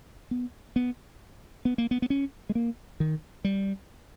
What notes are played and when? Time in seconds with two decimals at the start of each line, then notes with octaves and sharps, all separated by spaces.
0.31 B3
0.76 B3
1.65 B3
1.78 A#3
1.91 B3
2.02 B3
2.10 C#4
2.49 G#3
2.55 A#3
3.00 D#3
3.45 G3